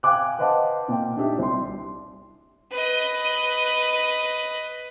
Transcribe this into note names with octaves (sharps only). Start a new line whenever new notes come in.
F5 G5 G#5 D6 F#6
B4 C5 D#5 F5 F#5 A5
A#2 G5
D4 D#4 G4 E5
C2 C6
B4 D#5